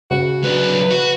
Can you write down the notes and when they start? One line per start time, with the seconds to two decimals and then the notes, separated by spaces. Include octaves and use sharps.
0.11 C#3 F#4
0.44 F#3 D4 B4
0.91 F#4